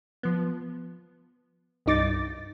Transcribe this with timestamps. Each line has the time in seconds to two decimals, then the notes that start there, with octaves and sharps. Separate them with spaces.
0.23 F3 B3
1.86 C2 G2 D#4 D6 A6